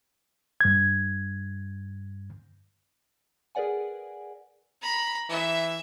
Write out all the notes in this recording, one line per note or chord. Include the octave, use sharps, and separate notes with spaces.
G2 G#6
G#4 A#4 B4 D5 F#5 G#5
A#5 B5
E3 E5